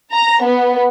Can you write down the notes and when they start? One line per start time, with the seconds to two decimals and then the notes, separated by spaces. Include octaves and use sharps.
0.13 A#5
0.43 B3